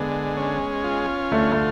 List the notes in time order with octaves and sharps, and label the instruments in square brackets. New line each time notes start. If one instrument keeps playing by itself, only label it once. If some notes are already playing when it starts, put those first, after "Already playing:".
Already playing: [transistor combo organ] D3 G#3 [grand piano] B3
[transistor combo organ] C#4
F4
[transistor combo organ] D2 [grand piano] A3
[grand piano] A3